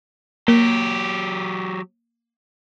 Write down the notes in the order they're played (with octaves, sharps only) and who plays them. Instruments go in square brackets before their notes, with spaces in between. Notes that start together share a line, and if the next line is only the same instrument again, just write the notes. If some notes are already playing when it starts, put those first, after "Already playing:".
[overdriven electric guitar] F#3 G4 [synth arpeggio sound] A#3